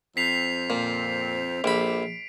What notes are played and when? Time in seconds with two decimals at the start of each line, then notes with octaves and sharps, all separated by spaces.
0.17 F2 C4 B6 C7 F7
0.70 A#2
1.64 A#1 F3 G4 A4 B5 D7